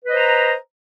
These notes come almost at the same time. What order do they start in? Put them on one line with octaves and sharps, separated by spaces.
B4 D#5 C5 A#5